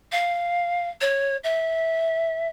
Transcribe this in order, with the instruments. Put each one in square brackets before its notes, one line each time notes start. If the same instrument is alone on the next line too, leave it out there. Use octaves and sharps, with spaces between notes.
[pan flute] F5
C#5
E5